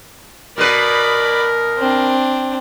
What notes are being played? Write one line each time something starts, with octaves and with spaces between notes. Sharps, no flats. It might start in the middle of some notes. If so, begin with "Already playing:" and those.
B2 A#4 B4 D5 B5
C4 D4